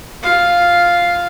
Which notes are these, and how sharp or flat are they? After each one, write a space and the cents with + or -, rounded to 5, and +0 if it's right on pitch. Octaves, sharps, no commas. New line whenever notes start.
F4 +0 F5 +0